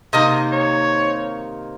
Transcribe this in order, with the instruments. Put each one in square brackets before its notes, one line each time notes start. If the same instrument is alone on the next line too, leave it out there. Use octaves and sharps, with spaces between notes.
[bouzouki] C3 D#3 A#3 [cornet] D#5
[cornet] C#5